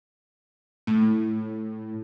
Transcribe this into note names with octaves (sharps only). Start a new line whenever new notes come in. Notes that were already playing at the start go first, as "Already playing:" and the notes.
A2